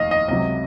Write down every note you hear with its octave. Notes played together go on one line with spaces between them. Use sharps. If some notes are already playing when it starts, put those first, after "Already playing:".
Already playing: F1 D#2 D#5 F5
D#5
C#2 C3 F#3 D#5